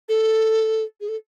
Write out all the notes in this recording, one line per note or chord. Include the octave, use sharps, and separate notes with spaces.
A4
G#4
A4